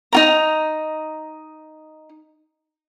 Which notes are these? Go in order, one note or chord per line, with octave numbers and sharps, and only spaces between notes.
D#4 F4 A#5